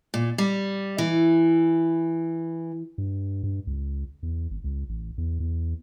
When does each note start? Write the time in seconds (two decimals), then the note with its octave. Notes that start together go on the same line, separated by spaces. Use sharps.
0.14 A#2
0.38 G3
0.98 E3
2.98 G2
3.43 G2
3.67 C#2
4.23 E2
4.51 G#1
4.64 C#2
4.89 A1
5.18 E2
5.40 E2